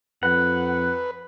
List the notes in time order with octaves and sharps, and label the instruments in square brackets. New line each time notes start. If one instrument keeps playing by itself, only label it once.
[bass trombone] F2 [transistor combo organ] B4 [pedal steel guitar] F#5